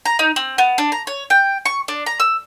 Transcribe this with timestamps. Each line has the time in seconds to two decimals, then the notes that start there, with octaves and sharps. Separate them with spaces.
0.05 A#5
0.19 D#4
0.36 C4
0.58 B3
0.78 D4
0.92 A#5
1.07 C#5
1.30 G5
1.65 C#6
1.88 D4
2.06 A#5
2.20 E6